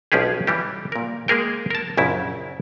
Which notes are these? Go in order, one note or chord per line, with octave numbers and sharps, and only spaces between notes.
B1 F3 C#4 G4 G#4
E3 G3 G4
A#2 A#4
G#3 A#3 G#4 A#4 G5
A#4 A5
A#1 F#2 C#3 E4